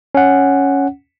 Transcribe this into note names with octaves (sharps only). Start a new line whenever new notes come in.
C#4 F#5